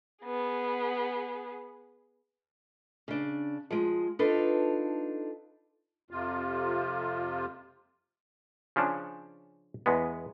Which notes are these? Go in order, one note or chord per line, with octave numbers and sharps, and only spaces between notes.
B3 G#4
C#3 D4
F3 G#3
D4 D#4 F4 A4 B4
F2 C3 F4
C#3 F3 C#4 D4
E2 G#3 B3